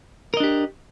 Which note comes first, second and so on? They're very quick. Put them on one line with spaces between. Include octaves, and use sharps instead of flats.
A#4 D#5 D4 G4